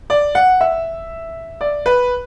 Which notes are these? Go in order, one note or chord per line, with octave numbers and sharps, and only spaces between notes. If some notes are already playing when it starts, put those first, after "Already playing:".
D5
F#5
E5
D5
B4